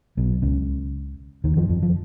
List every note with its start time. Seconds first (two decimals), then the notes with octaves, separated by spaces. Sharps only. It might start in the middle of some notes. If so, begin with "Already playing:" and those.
0.17 B1 B2
0.42 C#2 C#3
1.44 D#2 D#3
1.56 F2 F3
1.69 F2 F3
1.83 F3